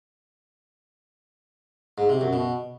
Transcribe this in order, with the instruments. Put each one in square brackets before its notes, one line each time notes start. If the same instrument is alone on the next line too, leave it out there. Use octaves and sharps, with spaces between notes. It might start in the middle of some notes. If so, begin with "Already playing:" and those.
[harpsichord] G#2
C3
F#2
B2